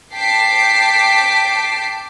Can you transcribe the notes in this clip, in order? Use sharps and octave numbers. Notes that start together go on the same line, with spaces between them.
G5 A5 D6 B6 C7 D7